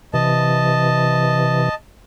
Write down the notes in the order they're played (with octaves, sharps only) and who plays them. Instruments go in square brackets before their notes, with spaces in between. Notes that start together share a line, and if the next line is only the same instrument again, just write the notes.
[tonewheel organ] C3 E3 [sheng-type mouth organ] D#5 A5